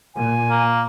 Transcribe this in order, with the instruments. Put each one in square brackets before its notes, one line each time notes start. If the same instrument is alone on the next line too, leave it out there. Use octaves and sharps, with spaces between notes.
[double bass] A#2 [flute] G#5
[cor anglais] A#3